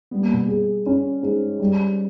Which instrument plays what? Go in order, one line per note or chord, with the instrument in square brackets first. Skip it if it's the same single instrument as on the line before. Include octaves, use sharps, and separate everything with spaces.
[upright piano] G3 [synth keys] B3
[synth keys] A#3
B2 B3
[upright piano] G#4
C#4
G#2
G3